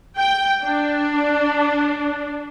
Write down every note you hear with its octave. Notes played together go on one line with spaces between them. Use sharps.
G5
D4